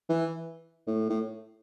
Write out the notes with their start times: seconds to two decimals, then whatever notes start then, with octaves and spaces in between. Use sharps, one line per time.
0.09 E3
0.87 A2
1.10 A2